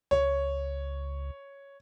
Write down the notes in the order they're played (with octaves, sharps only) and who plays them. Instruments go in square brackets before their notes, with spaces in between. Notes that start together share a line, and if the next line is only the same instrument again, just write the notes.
[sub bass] C#2 [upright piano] C#5